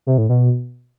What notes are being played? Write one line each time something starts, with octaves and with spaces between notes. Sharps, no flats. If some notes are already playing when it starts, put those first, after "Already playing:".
C3
A2
B2